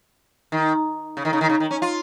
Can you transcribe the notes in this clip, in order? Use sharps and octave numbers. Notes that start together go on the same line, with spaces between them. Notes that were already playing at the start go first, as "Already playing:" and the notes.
D#3
C#3
D#3
C#3
D#3
C#3
D#3
C#4
F4